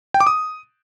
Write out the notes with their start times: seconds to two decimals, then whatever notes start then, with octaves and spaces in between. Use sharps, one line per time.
0.14 G5
0.20 D6
0.27 D#6